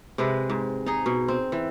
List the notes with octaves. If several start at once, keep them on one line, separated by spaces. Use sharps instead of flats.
C3 G#3 B4
G#2
D#4 G#4
B2
C4
E3